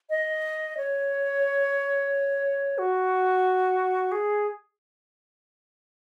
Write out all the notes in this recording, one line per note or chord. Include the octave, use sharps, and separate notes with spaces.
D#5
C#5
F#4
G#4